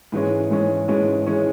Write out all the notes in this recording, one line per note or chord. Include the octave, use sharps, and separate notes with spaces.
G#2 E3 G#3 C#4
G#2 E3 G#3 C#4
G#2 E3 G#3 C#4
E3 G#3 C#4